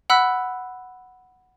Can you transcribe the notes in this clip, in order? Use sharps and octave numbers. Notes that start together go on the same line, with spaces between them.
F#5 B5 E6 F#6 B6